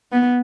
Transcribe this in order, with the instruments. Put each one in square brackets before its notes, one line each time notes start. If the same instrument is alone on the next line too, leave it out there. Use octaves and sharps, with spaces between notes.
[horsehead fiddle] B3